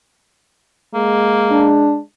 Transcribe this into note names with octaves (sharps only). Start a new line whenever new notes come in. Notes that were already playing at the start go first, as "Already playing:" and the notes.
G#3 A#3
D4